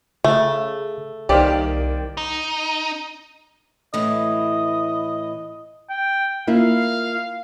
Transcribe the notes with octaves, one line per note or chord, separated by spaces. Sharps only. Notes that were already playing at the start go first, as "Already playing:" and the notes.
C#3 A3
C2 D#3 A#3 G4 C5 D5
D#4
A2 E3 D#5
G5
A#3 E4 F4 F5